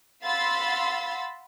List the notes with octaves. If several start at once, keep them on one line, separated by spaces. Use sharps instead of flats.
F5 F#5 B5 C6 E6 A6